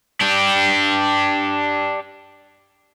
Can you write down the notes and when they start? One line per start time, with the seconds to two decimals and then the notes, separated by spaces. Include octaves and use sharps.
0.21 D4 G4